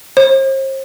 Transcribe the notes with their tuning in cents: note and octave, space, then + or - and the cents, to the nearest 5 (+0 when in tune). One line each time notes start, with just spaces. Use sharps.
C5 +40